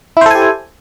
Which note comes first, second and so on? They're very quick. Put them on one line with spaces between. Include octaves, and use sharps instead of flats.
E4 C5 A4 G#5 G4